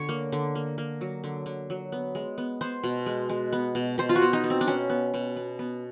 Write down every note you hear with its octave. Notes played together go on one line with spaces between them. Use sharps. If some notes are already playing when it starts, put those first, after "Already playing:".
Already playing: D3 C#5
A#3
D3
A#3
A#3
F#3
D3
D3
F#3
B3
G#3
B3
B3 C5
B2
G#3
G#3
B3
B2
B2 C5
F4
F#4
B2
D#4
B3
C4
D4
B2 C#4
B3
B2
B3
B3